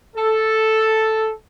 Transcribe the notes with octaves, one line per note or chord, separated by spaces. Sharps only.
A4